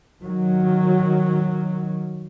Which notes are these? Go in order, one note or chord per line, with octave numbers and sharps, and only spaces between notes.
D#3 F#3